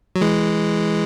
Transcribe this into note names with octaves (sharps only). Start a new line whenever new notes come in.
F#3
E3 G#3